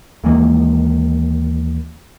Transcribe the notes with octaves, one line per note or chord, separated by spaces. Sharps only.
D#2 E3 G#3 A#3